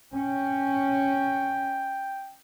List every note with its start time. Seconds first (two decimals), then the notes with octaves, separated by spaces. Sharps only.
0.13 C#4 G5